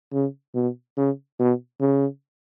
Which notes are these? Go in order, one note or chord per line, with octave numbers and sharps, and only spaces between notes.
C#3
B2
C#3
B2
C#3